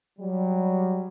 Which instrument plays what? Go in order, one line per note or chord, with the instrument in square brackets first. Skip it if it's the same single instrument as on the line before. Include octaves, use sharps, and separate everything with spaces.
[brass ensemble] F#3 G3